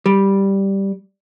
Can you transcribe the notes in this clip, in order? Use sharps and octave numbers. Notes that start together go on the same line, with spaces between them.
G3